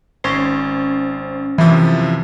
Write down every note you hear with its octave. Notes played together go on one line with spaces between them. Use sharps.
G#1 C#4 C5
F#2 C3 E3 F3